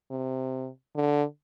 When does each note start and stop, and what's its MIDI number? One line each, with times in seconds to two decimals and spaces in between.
0.11 0.68 48
0.96 1.23 50